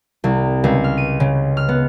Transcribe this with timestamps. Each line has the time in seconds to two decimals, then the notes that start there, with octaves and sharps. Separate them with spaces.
0.24 C2
0.64 C#2
0.84 F6
0.98 D#7
1.20 C#3
1.57 F6
1.69 B3